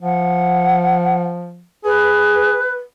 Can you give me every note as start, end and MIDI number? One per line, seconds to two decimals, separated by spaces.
0.01 1.65 53
0.01 1.20 78
1.85 2.61 68
1.85 2.72 71